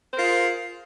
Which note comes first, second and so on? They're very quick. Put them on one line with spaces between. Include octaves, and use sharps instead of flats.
C5 A#4 F4 G#4